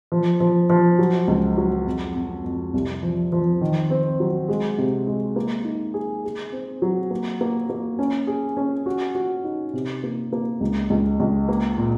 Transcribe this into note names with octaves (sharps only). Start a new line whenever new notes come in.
F3
F3
F3
F#3
C#2
F#3
F2
F2
F2
C2
F3
F3
D#3
C4
F#3
G#3
C3
G#3
A#3
D#4
G#4
G#4
C4
F#3
A#3
A#3
A#3
C#4
G#4
C#4
F#4
F#4
D#4
C3
A#3
A#3
C#2
C#2
C#2
A#3
A#2